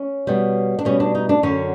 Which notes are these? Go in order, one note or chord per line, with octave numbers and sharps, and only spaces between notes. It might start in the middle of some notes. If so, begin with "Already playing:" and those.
Already playing: C#4
B2 G3
D4
B2 G3 C#4
D4
D#4
D4
F#2 D3 F#3 C#4